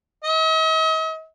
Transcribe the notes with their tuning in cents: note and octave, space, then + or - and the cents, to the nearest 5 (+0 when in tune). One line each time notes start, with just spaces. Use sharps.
D#5 +45